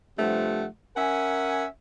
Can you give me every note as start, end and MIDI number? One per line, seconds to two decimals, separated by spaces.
0.18 0.66 43
0.18 0.66 48
0.18 0.66 53
0.18 0.66 57
0.18 0.66 78
0.97 1.66 61
0.97 1.66 70
0.97 1.66 76
0.97 1.66 78
0.97 1.66 80